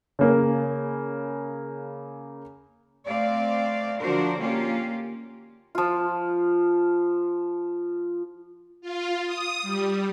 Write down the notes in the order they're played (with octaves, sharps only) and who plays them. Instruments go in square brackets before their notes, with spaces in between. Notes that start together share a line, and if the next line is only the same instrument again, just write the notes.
[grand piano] C#3 A#3
[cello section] A3 C4 D5 F5
D3 F3 D4 F#4 A#4 C5
A#3 C#4 F4 G4
[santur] F3 F4
[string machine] F4
D#6
G3